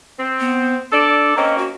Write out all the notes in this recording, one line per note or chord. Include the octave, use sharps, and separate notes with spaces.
C4
B3
D4 A4 D5
A#3 C4 C#4 D#5
F#4